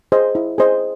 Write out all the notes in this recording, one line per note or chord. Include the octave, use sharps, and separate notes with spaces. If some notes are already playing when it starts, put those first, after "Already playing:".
G#4 C5 D#5
E4
G#4 C5 D#5